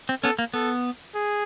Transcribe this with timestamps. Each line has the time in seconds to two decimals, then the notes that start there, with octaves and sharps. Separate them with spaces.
0.09 C4
0.24 B3 C#4 A4
0.39 A#3
0.54 B3 A4
1.15 G#4